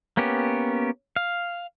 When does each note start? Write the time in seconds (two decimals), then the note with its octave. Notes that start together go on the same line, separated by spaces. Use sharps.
0.17 A#3 B3 C#4 G4
1.16 F5